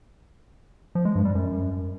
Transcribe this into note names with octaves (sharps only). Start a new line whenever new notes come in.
F3
G#3
G2
G3
F#2